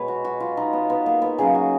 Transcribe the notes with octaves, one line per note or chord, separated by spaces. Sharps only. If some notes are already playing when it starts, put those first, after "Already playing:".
Already playing: B2 G#3 B4 C#5
F#4
F#4
F4
D#4
B3
B3
A#3
B3
C#3 F#3 A#3 G#4
F#4